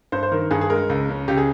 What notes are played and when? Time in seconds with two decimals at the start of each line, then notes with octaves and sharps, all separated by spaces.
0.12 G2 C5
0.23 C5
0.32 D#3 A#4
0.51 G2 G#4
0.61 G#4
0.70 G#3 A#4
0.89 C#2
1.09 C#3
1.28 C#2 G4
1.37 G#4